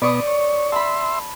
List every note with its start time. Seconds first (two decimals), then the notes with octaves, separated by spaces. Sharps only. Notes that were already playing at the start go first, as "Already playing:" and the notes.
0.02 B2 B3 D5 C#6 D#6
0.27 C#5
0.72 E5 A5 B5 C6